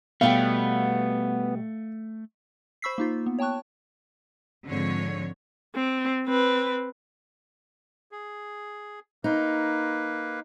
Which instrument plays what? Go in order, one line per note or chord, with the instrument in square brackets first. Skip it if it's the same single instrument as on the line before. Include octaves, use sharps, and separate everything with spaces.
[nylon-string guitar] B2 G3 G5 [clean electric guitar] A3 [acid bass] B3 [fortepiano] F5
[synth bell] C5 B5 C#6 E6 B6 C7
A#3 D#4 F4
B3
C#5 G5 A5 C#6 F#6
[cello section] G#2 D3 F3 C4 C#5
[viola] C4
C4 B4
[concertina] G#4
[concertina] A#3 B4 [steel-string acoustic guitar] D#4